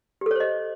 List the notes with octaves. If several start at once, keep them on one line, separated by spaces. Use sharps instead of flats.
G4 A4 C5 C#5 D#5